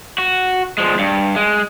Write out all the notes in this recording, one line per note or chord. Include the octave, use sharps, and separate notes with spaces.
F#4
F3 G#3
G2
G#3